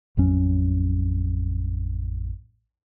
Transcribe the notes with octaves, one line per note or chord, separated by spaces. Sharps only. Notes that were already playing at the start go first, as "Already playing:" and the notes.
A1 F2 F#3 C#4